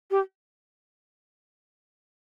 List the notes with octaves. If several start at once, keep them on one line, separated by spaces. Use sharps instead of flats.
G4